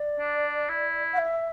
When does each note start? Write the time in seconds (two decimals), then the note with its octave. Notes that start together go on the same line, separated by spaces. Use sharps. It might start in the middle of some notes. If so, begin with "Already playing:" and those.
Already playing: D5
0.19 D4
0.69 E4
1.13 F#5
1.18 E5